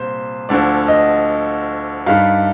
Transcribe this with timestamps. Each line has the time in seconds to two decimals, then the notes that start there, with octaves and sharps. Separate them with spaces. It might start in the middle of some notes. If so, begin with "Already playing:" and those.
Already playing: C2 A#2 G3 C5
0.49 D2 D3 F3 D5
0.88 D#5
2.06 G2 D#3 G3 F5